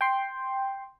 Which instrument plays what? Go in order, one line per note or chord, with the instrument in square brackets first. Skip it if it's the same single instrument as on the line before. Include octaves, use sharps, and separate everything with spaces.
[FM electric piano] G5 C6